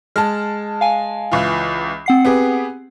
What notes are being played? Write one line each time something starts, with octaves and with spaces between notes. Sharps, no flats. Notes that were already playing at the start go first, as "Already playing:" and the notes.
G#3 A5 F6
F5 G#5
C#2 E3 F4
C4 F#5 C7
B3 G4 G#4